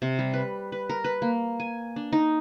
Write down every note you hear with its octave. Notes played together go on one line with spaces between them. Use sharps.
C3
G3
B4
B4
A#4
B4
A#3
G#5
D4
D#4